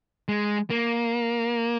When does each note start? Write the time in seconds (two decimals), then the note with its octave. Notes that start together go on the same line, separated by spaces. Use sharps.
0.28 G#3
0.70 A#3